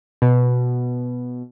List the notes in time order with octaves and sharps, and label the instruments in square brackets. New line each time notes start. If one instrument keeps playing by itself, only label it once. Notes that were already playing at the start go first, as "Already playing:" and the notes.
[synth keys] B2